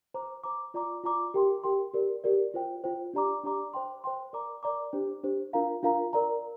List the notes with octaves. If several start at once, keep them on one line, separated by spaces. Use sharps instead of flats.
C5 A#5 D6
C5 A#5 D6
F4 D5 A#5 D6
F4 D5 A#5 D6
G4 A#4 G5 C6
G4 A#4 G5 C6
G4 A#4 D5
G4 A#4 D5
F4 C5 G5
F4 C5 G5
D4 G4 D5 A#5 D6
D4 G4 D5 A#5 D6
C5 G5 C6
C5 G5 C6
A#4 D5 A#5 D6
A#4 D5 A#5 D6
D4 G4 C5
D4 G4 C5
D4 F4 A#4 F5 A#5
D4 F4 A#4 F5 A#5
A#4 D5 A#5